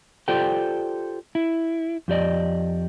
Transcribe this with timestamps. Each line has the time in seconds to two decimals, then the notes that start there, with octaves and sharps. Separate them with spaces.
0.28 F4 G4 A4 C5 D5 G5
1.35 E4
2.08 F2 G4 D5 D#5